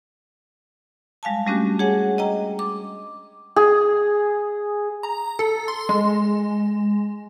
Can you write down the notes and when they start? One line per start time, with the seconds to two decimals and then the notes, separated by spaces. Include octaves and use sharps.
1.23 G3 G#3 F5 G#5 A5
1.47 G3 A3 C#4 D4 F#4 G4
1.79 G#4 C#5 F#5 G#5
2.18 D#5 G5 A#5
2.59 D6
3.56 G#4
5.03 A#5
5.39 A4
5.68 C6
5.89 G#3